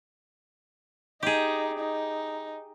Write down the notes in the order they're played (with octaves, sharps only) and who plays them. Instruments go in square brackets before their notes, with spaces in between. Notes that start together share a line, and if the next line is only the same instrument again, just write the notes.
[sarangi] D#4 [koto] G4 G#4
[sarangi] D#4